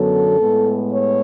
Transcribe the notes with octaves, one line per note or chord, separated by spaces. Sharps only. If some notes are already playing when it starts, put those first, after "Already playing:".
Already playing: F#2 D3 F#3 B3 A4
A2 G#3 B3
C#5